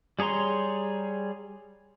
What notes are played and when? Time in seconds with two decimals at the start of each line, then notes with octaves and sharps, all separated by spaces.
0.19 G3 G#4 C#5 A#5 C6